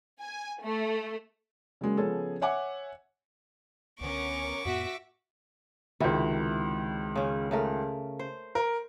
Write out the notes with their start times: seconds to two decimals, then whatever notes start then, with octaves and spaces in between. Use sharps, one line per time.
0.20 G#5
0.62 A3
1.81 C#3 F#3 G#3 A#3
1.97 C#3 F3 B3 C#4 G#4 A4
2.41 C#5 E5 F#5 G#5 D6 C#7
4.01 C#2 D3 B3 C#4 A#4 C#6 D6
4.65 F2 A2 B3 F#4 E5 B6
6.00 C#2 C3 D#3 E4 F#4
7.16 C#3 C#4
7.51 C#3 A3 A#4
8.19 C5
8.55 A#4